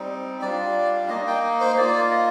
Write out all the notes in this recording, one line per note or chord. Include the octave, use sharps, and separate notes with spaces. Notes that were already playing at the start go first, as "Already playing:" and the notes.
Already playing: G3 C4 D#4
G3 D4 F4 D5
A#3 D#4 D#5
G5
C5
A#3 F4 D5
D#5